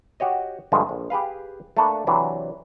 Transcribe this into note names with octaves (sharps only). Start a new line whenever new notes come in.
F#4 G4 C#5 D#5
G2 D3 F3 G#3 A3
A#1
G4 G#4 B4 F5
A3 A#3 D4 A4 B4
C3 E3 F#3 C4 D4